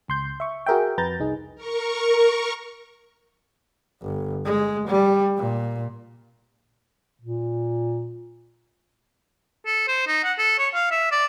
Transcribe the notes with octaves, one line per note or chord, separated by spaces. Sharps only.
C#2 C6 G6
E5 C#6
F#4 G#4 A#4 E5 G5
F2 B4 A#5 G6 A6
C2 D#4 G#4
A#4 C#6
G1
G#3
G3
A#2
A#2
A4
C5
D#4
F#5
A4
C#5
F5
E5
D5